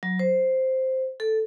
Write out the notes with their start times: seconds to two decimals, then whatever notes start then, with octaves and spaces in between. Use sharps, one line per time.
0.03 F#3
0.19 C5
1.20 A4